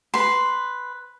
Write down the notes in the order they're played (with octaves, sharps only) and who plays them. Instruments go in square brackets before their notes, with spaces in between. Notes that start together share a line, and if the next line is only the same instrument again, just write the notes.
[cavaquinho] B4 C6